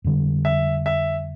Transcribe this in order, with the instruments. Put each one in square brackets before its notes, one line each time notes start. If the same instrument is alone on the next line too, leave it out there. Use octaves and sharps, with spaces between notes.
[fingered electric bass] F2 D3 G3
[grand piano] E5
E5